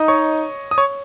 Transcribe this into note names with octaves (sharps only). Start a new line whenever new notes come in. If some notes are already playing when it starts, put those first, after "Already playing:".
Already playing: D#4 D#5 D#6
C#5 C#6
D#6
C#5 C#6